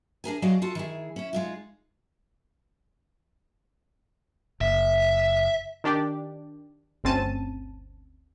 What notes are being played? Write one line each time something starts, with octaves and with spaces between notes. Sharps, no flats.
D4 G#4 A#4 G#5
F#3 F#4 G#4 D5 D#5 F5
F4 F#4 A4
D#3 E4 G#4
C#4 E4
G#3 D#4 F4
F#1 E5
D#3 D4 G4 D5
G1 D2 C4 C#4 A5 D#7